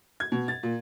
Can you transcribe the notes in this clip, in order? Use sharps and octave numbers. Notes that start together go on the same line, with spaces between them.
G#6
B2
A6
A#2